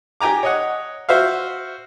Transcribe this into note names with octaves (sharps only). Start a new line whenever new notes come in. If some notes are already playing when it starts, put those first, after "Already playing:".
G4 G5 G#5 A#5 D6
C#5 D#5 F#5
F#4 C5 E5 F5